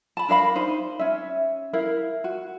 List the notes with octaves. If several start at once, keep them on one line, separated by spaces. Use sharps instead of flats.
A5 B5
D4 A#4 F5 B5
D#4 C5
C#4 E5
E4 A#4 F5
F#4